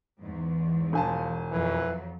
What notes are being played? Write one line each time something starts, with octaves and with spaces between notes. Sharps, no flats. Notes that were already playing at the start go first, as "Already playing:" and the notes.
E2 G#2
E1 F3 G#5 A5
F2 E3 F#3